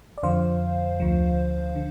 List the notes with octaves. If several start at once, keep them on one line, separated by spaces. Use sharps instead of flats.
D5
F2 D3 F3 C5 F5
D2 D3 F3
D3